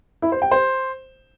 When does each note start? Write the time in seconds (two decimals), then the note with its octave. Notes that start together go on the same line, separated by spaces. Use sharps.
0.22 E4
0.32 C5
0.42 G5
0.51 C5